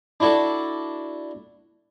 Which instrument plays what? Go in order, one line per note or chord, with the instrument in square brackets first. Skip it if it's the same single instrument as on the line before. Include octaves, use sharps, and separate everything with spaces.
[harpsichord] D4 E4 F#4 A4